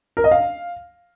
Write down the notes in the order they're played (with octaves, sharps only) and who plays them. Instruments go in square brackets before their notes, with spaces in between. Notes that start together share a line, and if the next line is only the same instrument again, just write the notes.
[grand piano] A#4
D#5
F5